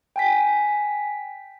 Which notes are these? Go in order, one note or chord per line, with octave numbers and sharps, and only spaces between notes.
G5 G#5 B6